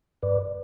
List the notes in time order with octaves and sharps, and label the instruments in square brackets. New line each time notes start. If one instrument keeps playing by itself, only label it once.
[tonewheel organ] G2 B4 D5